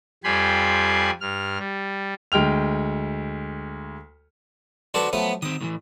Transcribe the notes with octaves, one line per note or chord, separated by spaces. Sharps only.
F2 G3 G4 G#5 B5 C6
G2 F6
G3
D2 G#3 G5 F6 F7
D4 F#4 A4 B4 C5 D5
F3 F#3 A3 B3
D#3 C4 D#6
A2 D#3 E3